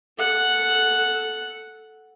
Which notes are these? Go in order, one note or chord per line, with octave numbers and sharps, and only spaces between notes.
A4 F#5